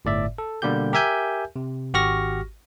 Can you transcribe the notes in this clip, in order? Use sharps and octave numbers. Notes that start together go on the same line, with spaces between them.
G1 A2 D5 E5
A4
B2 D3 G3 A#3 G4 G6
G4 A#4 E5 G#5 G6
C3
G#1 F#4 G4 C#6 F6 A#6